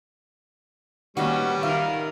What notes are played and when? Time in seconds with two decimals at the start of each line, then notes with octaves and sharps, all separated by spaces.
1.17 A#2 D#3 G3 A#3 B3 C#4 F#4
1.63 D#3 F4 A#4 E5